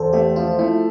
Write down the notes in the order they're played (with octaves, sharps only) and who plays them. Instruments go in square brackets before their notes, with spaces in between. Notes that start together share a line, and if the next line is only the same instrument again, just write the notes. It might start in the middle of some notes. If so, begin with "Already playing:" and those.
Already playing: [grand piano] E2 [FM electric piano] A4 C5
[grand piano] A3 [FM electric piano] G4
[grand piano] F3 [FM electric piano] F4
[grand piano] A3 [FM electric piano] E4